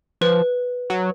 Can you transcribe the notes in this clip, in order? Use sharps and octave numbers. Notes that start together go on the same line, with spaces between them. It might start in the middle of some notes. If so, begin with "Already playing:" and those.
F3 B4
F#3